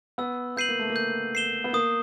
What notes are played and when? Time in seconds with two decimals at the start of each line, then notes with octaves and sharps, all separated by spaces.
0.18 B3 E6
0.57 B3 G6 C7 D#7 F#7
0.69 A#3
0.79 A3
0.90 A#3
0.96 G6
1.35 C7 E7 G7
1.64 B3
1.73 A#3 D#6